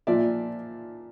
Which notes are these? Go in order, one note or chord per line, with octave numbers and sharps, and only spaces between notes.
A#2 F3 D5 E5